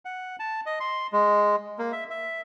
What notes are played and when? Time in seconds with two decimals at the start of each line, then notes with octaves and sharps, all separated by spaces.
0.05 F#5
0.39 A5
0.66 D#5
0.80 C6
1.12 G#3
1.79 A#3
1.92 E5
2.10 E5